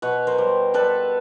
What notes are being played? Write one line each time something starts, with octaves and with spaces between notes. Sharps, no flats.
B2 B4 C#5
A#4 C5
G3
G3 A4 B4